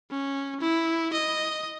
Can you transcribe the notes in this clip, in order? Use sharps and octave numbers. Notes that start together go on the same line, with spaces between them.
C#4
E4
D#5